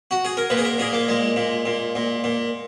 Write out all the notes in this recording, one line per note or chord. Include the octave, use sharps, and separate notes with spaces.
F#4
G#4
A#4
A#2 B4
G#4
A#4
A#2 G#4
A#3
A#2 G#3
A#2
A#2
A#2
A#2